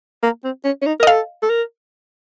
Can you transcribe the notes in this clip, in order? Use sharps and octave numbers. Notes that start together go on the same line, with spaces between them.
A#3
C4
C#4
C#4
D#4
A#4
D#5
A4 F5
A4
A#4